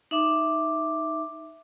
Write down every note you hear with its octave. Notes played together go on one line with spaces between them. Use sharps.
D#4 E5 D6